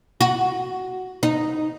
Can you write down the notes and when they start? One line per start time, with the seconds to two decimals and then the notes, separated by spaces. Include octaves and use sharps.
0.21 F#4
1.23 D#4